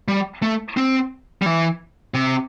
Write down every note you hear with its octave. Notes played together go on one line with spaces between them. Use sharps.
G3
A3
C4
G3
E3
C3